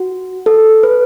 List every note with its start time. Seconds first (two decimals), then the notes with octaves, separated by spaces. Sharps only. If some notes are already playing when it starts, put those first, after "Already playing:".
Already playing: F#4
0.46 A4
0.83 B4